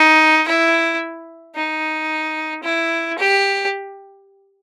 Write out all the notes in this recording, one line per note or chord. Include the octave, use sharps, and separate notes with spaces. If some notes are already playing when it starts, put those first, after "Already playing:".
Already playing: D#4
E4
D#4
E4
G4